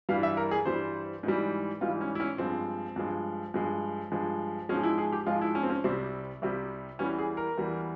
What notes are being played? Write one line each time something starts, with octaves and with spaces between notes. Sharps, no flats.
G2 E3 G3 F5
E5
A#4
G#4
G2 E3 G3 C5
G#2 E3 G3
G#2 E3 G3 F4
C#4
E4
C#4
G2 F3 G#3 C4
G2 F3 G#3
G2 F3 G#3
G2 F3 G#3
G#2 F3 G#3 C#4
E4
G#4
G4
G#2 F3 G#3 F4
E4
C#4
C4
C#4
C2 C3 G3 C4
C2 C3 G3
E2 E3 G3 C#4
G#4
A#4
E2 E3 G3